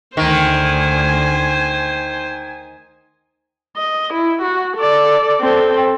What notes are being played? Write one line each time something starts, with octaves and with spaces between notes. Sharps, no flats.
D2 D#3 C5 G#5
D#5
E4
F#4
A4 D5
C4 A4